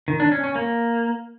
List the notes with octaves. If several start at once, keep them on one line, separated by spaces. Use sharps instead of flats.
D#3
D4
C#4
C#4
A#3